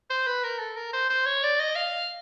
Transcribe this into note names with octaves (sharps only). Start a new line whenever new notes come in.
C5
B4
A#4
A4
A#4
C5
C5
C#5
D5
D#5
F5